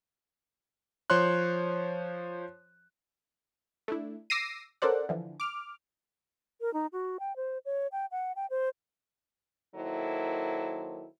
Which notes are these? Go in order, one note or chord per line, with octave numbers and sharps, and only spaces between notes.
F3 C5 C#5 C6 F#6
A3 D4 E4
D6 E6 A#6 C7 D#7
C#4 A4 A#4 C5 D5 F#5
D3 E3 F3
D6 F6
A#4
D#4
F#4
G5
C5
C#5
G5
F#5
G5
C5
D#3 F#3 A#3 E4 A4 C5